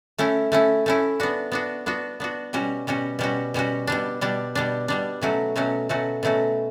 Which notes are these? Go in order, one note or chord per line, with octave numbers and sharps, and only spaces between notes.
A3 C#4 E4
A3 C#4 E4
A3 C#4 E4
B3 D4 F#4
B3 D4 F#4
B3 D4 F#4
B3 D4 F#4
B2 G3 C#4 F#4
B2 G3 C#4 F#4
B2 G3 C#4 F#4
B2 G3 C#4 F#4
B2 G3 D4
B2 G3 D4
B2 G3 D4
B2 G3 D4
B2 F#3 A3 C#4 F#4
B2 F#3 A3 C#4 F#4
B2 F#3 A3 C#4 F#4
B2 F#3 A3 C#4 F#4